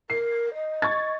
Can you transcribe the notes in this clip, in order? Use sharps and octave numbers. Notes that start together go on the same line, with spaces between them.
A#4 C7
D#5
C#6 G#6 A6